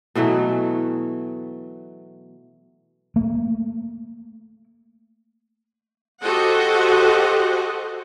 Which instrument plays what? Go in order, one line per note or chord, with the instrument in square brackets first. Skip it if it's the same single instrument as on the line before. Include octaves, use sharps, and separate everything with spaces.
[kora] B2 E3 F#3 A3
[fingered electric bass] A3 A#3
[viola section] F#4 G4 A4 C5 D#5 F#5